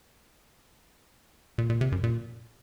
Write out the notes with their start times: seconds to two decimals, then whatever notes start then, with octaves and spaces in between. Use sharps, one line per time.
1.58 A#2
1.70 A#2
1.81 C3
1.92 F#2
2.04 A#2